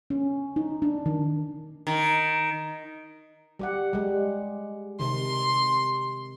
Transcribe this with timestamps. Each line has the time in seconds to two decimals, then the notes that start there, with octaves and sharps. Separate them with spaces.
0.10 C#4
0.56 D#4
0.82 D4
1.06 D#3
1.87 D#3
3.59 G3 G4 F#5
3.93 G3 G#3
5.00 C3 D#3 C6